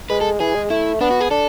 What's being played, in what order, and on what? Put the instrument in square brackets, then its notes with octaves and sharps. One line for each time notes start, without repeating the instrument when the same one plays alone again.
[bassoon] G#3 [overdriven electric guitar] B4
[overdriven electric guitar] A4
[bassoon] E3 [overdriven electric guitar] G#4
[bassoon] G#3
[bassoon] A3 [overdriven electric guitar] E4
[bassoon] B3 [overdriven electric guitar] D4
[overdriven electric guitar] F#4
G#4
[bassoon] D4 [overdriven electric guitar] A4